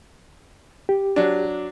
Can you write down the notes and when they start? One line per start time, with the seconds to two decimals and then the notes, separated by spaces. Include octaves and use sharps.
0.89 G4
1.16 F#3 D4